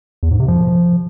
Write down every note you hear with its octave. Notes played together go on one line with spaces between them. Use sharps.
E2
G#2
C3
F3